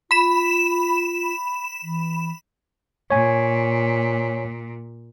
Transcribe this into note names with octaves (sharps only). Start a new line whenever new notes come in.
F4 B5 E7
E3
A#2 C#5 G#5